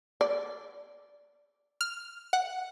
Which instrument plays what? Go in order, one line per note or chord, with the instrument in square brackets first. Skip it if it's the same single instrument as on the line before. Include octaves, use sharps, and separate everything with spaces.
[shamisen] D5
[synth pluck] F6
F#5